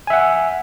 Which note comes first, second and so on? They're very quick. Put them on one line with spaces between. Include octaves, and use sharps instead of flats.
G#5 E5 F#5